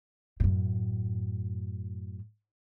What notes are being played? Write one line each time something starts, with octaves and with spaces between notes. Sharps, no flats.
F#2 A2